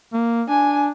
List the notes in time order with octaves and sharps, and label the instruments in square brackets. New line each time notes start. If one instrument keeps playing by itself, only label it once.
[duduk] A#3
[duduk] D4 [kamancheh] G#5